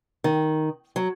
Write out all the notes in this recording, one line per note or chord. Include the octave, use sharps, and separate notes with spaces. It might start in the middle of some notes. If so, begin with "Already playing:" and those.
D#3
F#3